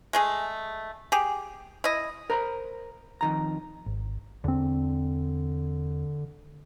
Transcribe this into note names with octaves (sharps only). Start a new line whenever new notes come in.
G#3 A3 G#4
G4 G#4
E4 D#5
A#4 C5 A#5 B5
F2 D#3 A#5
G#1
E2 D3 C4